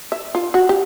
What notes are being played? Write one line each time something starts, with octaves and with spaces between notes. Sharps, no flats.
E5
F4
F#4
G4